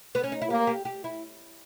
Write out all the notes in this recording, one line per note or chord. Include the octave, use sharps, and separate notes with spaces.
B3
C#4
D#4
E4
A#3 G4
G4
G4
E4